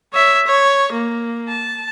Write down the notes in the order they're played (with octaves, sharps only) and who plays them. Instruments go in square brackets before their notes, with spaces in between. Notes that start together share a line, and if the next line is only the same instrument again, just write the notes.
[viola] C#5 E5
C#5
A#3
A5